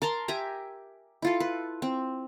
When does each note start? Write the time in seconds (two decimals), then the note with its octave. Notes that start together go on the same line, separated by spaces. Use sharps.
0.02 A#4 A5 A#5 C6
0.28 G4 E5 G#5 A#5
1.22 E4 F4 A4
1.40 B4
1.82 C4